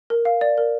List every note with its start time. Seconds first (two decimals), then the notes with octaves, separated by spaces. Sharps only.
0.10 A#4
0.25 F5
0.41 D5
0.58 A#4